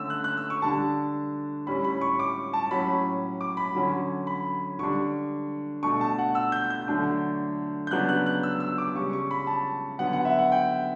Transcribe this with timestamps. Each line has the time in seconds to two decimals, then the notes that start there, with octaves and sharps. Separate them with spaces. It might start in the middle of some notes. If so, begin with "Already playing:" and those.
Already playing: D3 A3 C#4 E6
0.10 F#6
0.24 F#6
0.37 E6
0.50 C#6
0.62 D3 G3 D4 A5
1.66 A2 G3 C#4 B5
1.84 B5
2.01 C#6
2.19 D6
2.53 A5
2.71 A2 F#3 C#4 B5
3.41 D6
3.57 B5
3.75 D3 F#3 C#4
4.27 B5
4.79 D3 G3 D4 C#6
5.83 B2 A3 D4 C#6
6.01 A5
6.19 F#5
6.35 E6
6.52 G6
6.70 G6
6.88 D3 F#3 A3 D4
7.87 G6
7.91 C#3 F#3 B3 D4 F#6
8.09 F#6
8.26 F#6
8.43 E6
8.60 E6
8.78 D6
8.95 C#3 G3 C#4 C#6
9.13 C#6
9.31 B5
9.47 A5
9.99 D3 F#3 B3 F#5
10.13 F#5
10.25 E5
10.39 F#5
10.52 G5